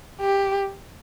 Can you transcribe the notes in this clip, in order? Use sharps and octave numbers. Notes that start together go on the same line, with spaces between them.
G4